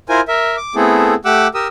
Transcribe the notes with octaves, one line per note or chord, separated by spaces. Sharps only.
E4 F4 A#4 C5 G#5
A#4 E5
D6
A3 B3 C4 E4 G#4 A4
A3 G4 F#5 D6 E6 F#6
G4 A#4 D#6 E6